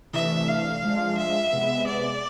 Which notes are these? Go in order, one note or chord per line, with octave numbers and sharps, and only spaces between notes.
C3 E3 A3 D4 E5
F5
F3 G#3 D4 F4
E5
C3 G#3 B3
D5